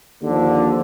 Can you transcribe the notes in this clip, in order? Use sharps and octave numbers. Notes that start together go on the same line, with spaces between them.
D#2 D3 F3